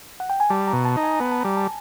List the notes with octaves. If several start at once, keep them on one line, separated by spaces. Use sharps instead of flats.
F#5
G5
G#5
G3 A5
A#5
B2
A5
D#4
G#5
B3 A#5
A5
G3 A#5
A5